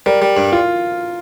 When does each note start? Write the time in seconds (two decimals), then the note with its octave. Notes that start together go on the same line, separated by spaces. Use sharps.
0.06 G3 A#4
0.22 G3
0.37 G2
0.53 F4